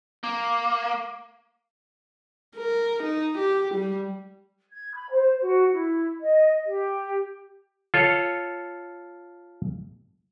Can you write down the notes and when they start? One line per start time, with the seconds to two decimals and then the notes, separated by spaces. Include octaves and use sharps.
0.24 A#3
2.56 A#4
3.03 D#4
3.38 G4
3.75 G3
4.70 G#6
4.94 B5
5.11 C5
5.41 F#4
5.72 E4
6.20 D#5
6.66 G4
7.94 F4 A4 C#5